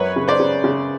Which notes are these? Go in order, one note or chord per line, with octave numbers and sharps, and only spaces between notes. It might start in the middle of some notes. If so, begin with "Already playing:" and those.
Already playing: F#2 B4 C#5
C#3
C5 D5
C#3
C#3